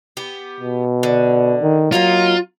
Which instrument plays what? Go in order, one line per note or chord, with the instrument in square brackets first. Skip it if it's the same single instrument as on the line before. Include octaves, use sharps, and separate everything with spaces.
[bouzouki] B3 G4
[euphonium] B2
[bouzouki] D3
[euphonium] D#3
[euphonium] F#3 [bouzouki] A#3 D#4 A#4 [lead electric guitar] F4